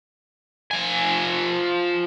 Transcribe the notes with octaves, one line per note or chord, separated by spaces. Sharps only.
F3 G#5